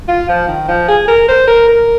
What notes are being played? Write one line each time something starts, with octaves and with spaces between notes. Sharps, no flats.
F4
F3
D#3
F3
G#4
A#4
C5
A#4
A#4